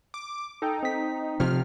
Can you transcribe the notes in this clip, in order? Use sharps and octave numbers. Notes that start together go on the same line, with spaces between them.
D6
D#4 A4 G5
C4 B6
C3 F3 F6